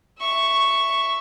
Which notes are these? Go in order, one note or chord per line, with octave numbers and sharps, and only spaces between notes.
E5 C#6